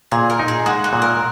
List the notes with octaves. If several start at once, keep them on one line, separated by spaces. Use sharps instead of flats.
A#2 G#4
A#4
D#4
G#4
G#3 F#4
F#4
A#2
A#4